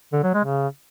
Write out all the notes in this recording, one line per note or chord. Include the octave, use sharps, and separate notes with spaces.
D3
F#3
G#3
C#3